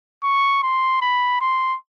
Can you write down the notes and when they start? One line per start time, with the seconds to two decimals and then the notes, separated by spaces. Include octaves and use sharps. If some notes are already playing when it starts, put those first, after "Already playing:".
0.23 C#6
0.63 C6
1.01 B5
1.41 C6